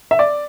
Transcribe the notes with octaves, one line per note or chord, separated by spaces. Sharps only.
E5
D5